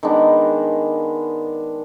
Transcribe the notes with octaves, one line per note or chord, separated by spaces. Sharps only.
D#3 G#3 B3 D4